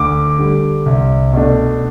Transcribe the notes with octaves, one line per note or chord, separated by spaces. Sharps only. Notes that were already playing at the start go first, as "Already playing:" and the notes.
Already playing: D2 D6
D3 G3
C2
B2 A3 D4